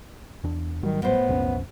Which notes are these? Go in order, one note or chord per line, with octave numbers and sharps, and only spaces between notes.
E2 D4
G#1 D#3 F#3 G3
A2 B3 C5
B1 F2 C#4